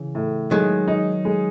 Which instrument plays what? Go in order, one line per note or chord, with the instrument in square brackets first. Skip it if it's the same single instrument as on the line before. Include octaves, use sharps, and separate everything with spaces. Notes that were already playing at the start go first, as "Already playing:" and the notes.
Already playing: [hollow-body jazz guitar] C#3 E3
[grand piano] A2
[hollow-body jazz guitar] D#3 F#3 [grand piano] G#3
[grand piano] D#4
G#3